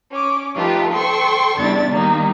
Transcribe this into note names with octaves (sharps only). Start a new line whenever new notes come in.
C#4 D6
F3 A3 D#4 F4 G4 B4
A4 C5 G5 C6 C#6
E2 C#3 G3 D4 E4 A6
D#3 G3 A#3 D#4